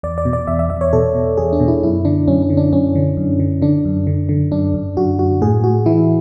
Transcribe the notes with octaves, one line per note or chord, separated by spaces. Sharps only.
E2 D5
D5
B2
D5
E2 E5
E5
E2 E5
C#5
B2 A4
B2
E2 G#4
D4
B2
E4
F#2 E4
D3 D4
F#2 C#4
D4
D3
D4
F#2 C#4
D3
F#2
D3
D3 D4
F#2
D3
D3
F#2 D4
F#2
F#2 F#4
F#2 F#4
A2 G#4
A2 F#4
E3 E4